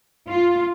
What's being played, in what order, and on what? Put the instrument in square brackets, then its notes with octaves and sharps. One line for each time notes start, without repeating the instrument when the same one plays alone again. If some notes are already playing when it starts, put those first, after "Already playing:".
[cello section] F4